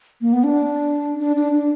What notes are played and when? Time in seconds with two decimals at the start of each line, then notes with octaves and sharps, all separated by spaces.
0.21 A#3
0.33 B3
0.44 D4
1.19 D4
1.36 D4
1.52 D4